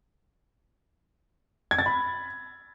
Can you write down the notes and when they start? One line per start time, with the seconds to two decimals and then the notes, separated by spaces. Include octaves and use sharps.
1.71 G#6
1.79 A6
1.86 B5